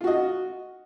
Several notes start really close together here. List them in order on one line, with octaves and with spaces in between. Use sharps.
F4 F#4 D#5